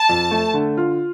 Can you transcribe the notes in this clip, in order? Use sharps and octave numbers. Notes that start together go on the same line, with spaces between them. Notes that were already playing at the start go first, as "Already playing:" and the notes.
Already playing: A5
F2
A3
D3
F4